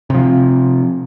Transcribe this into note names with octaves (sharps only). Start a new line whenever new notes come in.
C3 F3